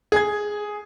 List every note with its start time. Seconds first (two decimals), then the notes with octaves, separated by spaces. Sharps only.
0.12 G#4 G#6